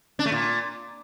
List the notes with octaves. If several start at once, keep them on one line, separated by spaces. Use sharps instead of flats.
D4
A3
A#2